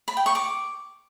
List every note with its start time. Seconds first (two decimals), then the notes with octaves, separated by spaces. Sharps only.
0.08 B5
0.17 G5
0.26 C#6
0.35 D6